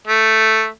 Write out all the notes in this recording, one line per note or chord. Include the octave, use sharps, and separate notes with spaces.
A3